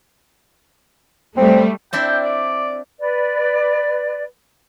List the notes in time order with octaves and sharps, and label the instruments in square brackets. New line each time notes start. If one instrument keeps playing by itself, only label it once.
[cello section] G3 A3 [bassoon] C4
[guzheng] C4 D4 E4 [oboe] G5
[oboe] G5
D5
[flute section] B4 D5